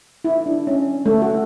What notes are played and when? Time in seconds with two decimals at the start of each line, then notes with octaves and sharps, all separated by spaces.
0.24 E4
0.46 D4
0.67 C#4
1.06 A3
1.22 F#4